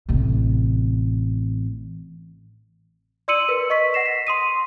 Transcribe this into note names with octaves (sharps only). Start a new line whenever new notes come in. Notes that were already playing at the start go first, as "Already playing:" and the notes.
A1 C3
D5 C6 E6 C#7 D#7 F#7
A#4 B4
D#5 C#6 B6
F#5 A#6 C7 E7
B6
C6 D#6 D#7